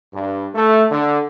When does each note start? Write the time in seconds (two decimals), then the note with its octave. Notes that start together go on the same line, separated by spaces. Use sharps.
0.13 G2
0.54 A3
0.90 D3